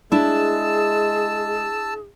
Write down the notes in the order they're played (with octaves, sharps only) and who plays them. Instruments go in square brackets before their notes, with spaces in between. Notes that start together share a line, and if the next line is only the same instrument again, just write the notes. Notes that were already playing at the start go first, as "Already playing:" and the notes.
[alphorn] G#3 [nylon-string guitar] D4 E4 [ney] G#4 [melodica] A5 E6